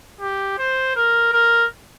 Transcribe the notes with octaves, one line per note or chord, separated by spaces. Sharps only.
G4
C5
A#4
A#4